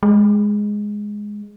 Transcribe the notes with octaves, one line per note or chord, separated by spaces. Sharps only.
G#3